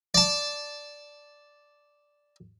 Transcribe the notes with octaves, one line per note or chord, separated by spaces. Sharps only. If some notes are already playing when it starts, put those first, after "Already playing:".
D5 A5